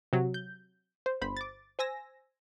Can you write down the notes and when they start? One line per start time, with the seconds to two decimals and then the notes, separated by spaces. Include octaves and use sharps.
0.13 C3 F#3
0.34 G6
1.06 C5
1.21 G1 C5 B5
1.37 D6 A6
1.79 C5 G#5 E6 A#6